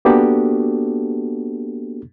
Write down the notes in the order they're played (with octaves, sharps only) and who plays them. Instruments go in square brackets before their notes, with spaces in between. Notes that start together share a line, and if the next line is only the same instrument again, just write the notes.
[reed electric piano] A#3 B3 D4 F#4 G4 A4